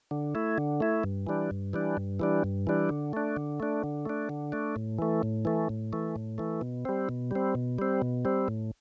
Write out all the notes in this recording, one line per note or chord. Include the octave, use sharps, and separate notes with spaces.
D3
A3 E4
D3
A3 E4
G2
E3 G3 D4
G2
E3 G3 D4
G2
E3 G3 D4
G2
E3 G3 D4
D3
A3 D4
D3
A3 D4
D3
A3 D4
D3
A3 D4
A2
E3 A3
A2
E3 A3
A2
E3 A3
A2
E3 A3
B2
G3 C4
B2
G3 C4
B2
G3 C4
B2
G3 C4
A2